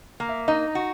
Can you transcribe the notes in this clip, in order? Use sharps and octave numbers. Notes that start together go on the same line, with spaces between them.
A#3
E5
D#4 D#5
F#4